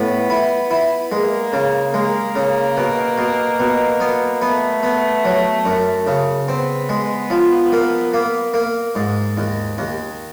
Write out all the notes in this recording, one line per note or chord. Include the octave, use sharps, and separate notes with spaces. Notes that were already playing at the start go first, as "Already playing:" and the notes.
Already playing: A2 B3
E4
E4
G#3 A#3
C#3
G#3 A#3
C#3
B2
B2
B2
B3
A3 B3
B3
F#3
F#2
C#3
B3 C4
G#3
F3
A#3
A#3
A#3
G#2
D#2
D#2